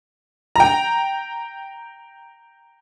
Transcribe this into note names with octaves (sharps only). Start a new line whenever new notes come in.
G5 A#5